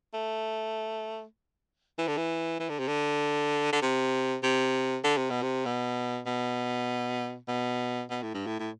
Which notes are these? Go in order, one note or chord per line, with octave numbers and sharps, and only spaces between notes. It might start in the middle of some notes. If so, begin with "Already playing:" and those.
A3
E3
D3
E3
E3
D3
C3
D3
D3
C3
C3
D3
C3
B2
C3
B2
B2
B2
B2
A2
G2
A2
A2